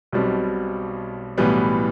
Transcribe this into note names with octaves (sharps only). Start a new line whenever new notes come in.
B1 B2 G3 C4
B1 A2 E3 G3 B3